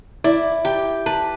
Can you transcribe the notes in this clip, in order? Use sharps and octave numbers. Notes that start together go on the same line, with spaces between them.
E4 D5
G4 G5
B4 A5